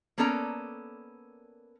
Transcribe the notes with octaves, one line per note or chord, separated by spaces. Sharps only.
A#3 B3 C#4 A4 D5 A#5